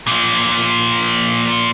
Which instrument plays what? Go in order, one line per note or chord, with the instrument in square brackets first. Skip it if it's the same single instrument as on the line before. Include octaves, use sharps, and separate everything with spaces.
[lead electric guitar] A#2 F3